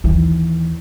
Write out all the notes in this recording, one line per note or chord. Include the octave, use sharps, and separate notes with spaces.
D#2 E3